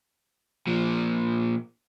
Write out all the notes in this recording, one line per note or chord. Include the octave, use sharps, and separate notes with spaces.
A#2 F3